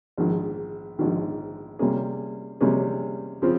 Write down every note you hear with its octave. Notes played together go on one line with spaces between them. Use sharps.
A#1 G#2 D#3
A#1 G#2 D#3
C3 G3 A#3 C#4 G#4
C3 G3 A#3 C#4 G#4
C#3 F3 C4